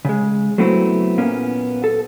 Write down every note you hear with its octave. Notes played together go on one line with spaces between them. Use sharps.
C#3 G#3
F#3 A3 B3 C4 E4
A#2 A#3 B3 C#4
A4